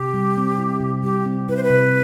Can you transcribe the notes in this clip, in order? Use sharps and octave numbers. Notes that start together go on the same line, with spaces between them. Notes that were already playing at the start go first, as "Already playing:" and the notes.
Already playing: C3 G4
G3
C4
E4
C3
G3 G4
C4
E4 B4
C5
B4
C3